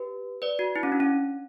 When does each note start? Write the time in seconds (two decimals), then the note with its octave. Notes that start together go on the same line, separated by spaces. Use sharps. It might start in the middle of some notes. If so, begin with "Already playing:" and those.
Already playing: G4 B4
0.42 B4 D5
0.59 F#4
0.76 E4
0.83 C#4
0.92 D4
1.00 C#4